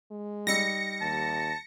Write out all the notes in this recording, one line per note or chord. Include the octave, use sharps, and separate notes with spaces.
G#3
G3 D#4 E6 A#6 C#7
D#2 A5